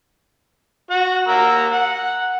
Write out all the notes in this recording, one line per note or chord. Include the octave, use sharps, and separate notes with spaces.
F#4 F#5
A#3 A#5 E6
F#5